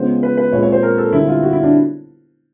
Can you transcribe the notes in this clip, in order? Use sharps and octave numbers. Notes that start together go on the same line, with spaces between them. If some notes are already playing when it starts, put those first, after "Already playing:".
Already playing: C#3 F3 G#3 B3 C5
B4
B4
A#2 F3 G#3 C4 C#5
C#5
C5
A#4
A4
D3 G3 C4 E4
F4
F#4
E4
D4